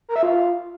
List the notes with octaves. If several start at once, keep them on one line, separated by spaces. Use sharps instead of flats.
A#4
E5
F4